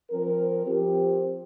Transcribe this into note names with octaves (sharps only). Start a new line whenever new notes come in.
F3 C4 A#4
F3 C4 G4